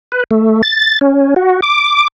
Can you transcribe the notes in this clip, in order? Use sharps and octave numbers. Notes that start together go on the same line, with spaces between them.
B4
A3
A6
C#4
F#4
D6